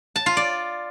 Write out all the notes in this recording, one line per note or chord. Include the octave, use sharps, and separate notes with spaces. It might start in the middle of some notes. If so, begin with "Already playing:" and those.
A5
F4
D5